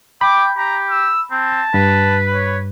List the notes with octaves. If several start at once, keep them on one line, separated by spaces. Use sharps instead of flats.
G5 B5 D6
G4 A#5
E6
C4 A5
G2 B4
C#5